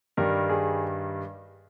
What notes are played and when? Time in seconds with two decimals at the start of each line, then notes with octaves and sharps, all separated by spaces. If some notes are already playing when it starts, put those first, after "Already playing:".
0.17 G2 D#3 G3 A#4
0.49 G#4